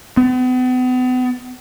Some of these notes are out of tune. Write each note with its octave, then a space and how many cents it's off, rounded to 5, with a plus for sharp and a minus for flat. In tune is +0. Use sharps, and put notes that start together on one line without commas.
B3 +40